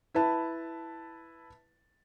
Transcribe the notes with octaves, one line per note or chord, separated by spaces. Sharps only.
E4 B4 A5